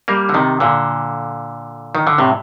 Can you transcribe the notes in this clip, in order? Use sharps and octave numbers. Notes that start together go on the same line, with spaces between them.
G3 A#3
D3
C3 D#3
A#2 D3
D#3
D3
A2 C3